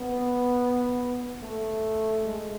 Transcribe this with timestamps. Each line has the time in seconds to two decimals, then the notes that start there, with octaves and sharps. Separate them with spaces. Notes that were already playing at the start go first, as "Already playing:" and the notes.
Already playing: B3
1.42 A3
2.26 G#3